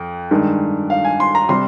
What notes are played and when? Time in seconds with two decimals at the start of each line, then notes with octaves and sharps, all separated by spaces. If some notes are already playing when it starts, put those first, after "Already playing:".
Already playing: F2
0.31 G2 D#3 G#3
0.90 F5
1.05 G#5
1.20 C6
1.35 A#5
1.49 C3 G3 C6